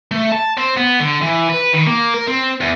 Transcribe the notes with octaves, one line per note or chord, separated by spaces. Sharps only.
A3
A5
C4
B3
D3
E3
B4
D#3
A#3
A#4
C4
E2